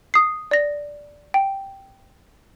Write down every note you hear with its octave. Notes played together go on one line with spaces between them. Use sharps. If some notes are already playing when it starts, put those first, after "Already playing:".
D#6 C7
D5 A#6
G5